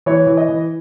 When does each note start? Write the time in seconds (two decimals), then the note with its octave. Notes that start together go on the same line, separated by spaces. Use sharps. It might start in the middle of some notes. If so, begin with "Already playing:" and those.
0.06 E3 C#5
0.27 E3
0.37 D#5
0.49 E3